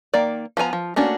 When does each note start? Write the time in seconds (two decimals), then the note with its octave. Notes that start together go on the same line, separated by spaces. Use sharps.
0.14 D#3 A#3 D5
0.57 F3 B3 G#5 A#5
0.73 F3
0.96 A3 A#3 C#4 D4 F#4